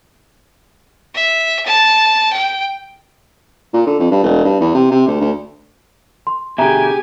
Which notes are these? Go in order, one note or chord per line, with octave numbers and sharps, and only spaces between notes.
E5
A5
G5
A#2
D3
F2
G2
E1
G2
E2
C3
C3
D2
D2
C6
B2 D3 G4 G#4 E5 G#5 A#5